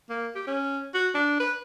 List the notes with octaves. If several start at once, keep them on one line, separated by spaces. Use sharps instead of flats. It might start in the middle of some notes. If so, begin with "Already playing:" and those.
A#3
G4
C#4
F#4
D4
B4